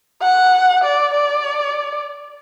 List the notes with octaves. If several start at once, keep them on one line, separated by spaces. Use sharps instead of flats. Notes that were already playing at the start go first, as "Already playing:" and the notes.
F#5
D5
D5